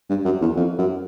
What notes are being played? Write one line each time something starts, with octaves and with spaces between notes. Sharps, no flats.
G2
F#2
E2
F2
F#2